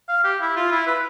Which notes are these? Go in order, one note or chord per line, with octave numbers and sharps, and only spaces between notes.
F5
G4
E4
F4
E4
B4